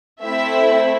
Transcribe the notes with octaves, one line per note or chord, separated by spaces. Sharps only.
A3 C4 E4 E5